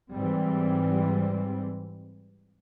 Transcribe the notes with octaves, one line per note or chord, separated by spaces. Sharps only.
G#2 E3 G3 C4